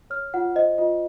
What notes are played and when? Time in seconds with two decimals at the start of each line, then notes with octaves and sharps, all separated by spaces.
0.10 C#5 F6
0.34 F4 F#5
0.55 C5 D#5
0.78 F4 D#5